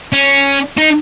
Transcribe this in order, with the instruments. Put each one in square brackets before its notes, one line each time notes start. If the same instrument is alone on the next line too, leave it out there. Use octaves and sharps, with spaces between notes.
[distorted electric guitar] C#4
D#4